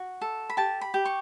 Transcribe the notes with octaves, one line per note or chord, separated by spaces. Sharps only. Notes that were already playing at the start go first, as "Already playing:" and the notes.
Already playing: F#4
A4
B5
G4 A5
B5
G4
C#6